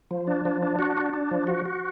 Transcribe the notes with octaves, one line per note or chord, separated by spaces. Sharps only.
F3
D4
F3
D4
F#4
D4
D4
F3
F#4
F#4